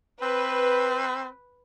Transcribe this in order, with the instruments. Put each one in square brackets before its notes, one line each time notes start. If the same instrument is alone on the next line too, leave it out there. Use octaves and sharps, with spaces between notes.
[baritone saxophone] C4 [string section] B4